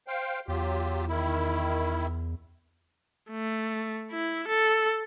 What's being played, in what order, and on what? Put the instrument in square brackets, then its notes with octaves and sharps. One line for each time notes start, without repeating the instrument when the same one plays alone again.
[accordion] C5 F5 G5
[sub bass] E2 [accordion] F#3 F4 G4
[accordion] D#3 E4
[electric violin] A3
E4
A4